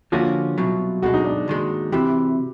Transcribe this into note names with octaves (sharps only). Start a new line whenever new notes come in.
D3 F3 A#3 C#4 F4 F#4
C2 B2 F#3
B1 B2 G#3 F#4
D#4
D4
D#2 D#3 G#3
E2 C3 E3 G4